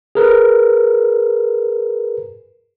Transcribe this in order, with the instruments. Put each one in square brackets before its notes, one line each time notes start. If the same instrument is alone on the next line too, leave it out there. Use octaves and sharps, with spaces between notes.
[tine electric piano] G#4 A#4 B4